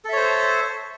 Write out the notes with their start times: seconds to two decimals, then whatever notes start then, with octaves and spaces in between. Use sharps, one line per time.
0.05 A4
0.09 E5
0.13 C#5
0.17 C5